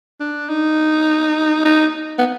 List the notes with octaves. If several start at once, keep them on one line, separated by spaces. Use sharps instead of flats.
D4
D#4
D#4
B3